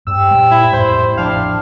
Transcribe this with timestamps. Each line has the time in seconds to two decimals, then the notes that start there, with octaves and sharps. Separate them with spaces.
0.07 G2 C3 G3 C4 E6
0.31 A#2 G#3
0.51 E4
0.73 F2 A2 C5
1.17 A1 F3 F#3 D4 F5